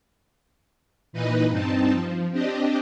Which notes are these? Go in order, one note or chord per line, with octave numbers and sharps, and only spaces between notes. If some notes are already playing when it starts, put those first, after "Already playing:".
A#2 E3 D#4 B4 D#5
G2 C4 D#4 A5
F3
C4 D4 G4 D#5